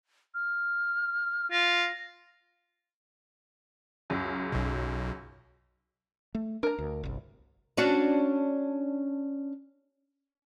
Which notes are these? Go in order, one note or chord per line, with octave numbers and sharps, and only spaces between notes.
F6
F4 A#6
C#2 F#2 C#3
B1 B2
A3
D4 A#4 A#5
D2
G1 C2
C#4 D4 F#4